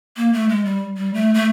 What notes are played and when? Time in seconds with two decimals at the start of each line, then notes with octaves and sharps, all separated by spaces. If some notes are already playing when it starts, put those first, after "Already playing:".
0.17 A#3
0.33 A3
0.49 G#3
0.65 G3
0.97 G3
1.14 A3
1.34 A3